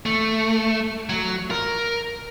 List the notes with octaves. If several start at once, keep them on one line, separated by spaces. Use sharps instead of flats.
A3
F#3
A#4